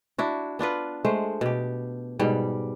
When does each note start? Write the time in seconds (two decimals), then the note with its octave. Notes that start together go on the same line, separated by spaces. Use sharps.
0.18 D4 E4 F#4
0.59 B3 D4 F4 B4
1.05 G#3 A3 C5
1.41 B2 G4
2.19 G#2 B2 G3